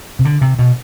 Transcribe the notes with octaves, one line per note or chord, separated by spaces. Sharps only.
C3
D3
C3
B2